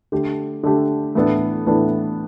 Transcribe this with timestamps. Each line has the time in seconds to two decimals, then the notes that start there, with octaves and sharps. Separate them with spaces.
0.12 D3 A3 G4
0.63 D3 A3 G4
1.15 A2 E3 B3 D4 A4
1.67 A2 E3 B3 D4 A4